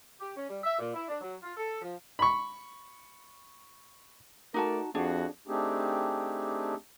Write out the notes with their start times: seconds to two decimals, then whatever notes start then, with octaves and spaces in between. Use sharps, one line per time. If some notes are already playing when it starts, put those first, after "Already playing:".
0.20 G4
0.37 C#4
0.49 G3
0.63 E5
0.79 A#2
0.93 E4
1.08 D4
1.21 F#3
1.43 F4
1.57 A4
1.82 F3
2.19 B5 C#6
4.54 A3 D#4 F#4 A#4 D5 A5
4.95 F2 D4 F#4 G#4
5.47 A3 C4 D4 D#4 G4 G#4